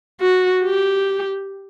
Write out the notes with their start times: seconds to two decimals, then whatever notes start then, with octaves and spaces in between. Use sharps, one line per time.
0.21 F#4
0.63 G4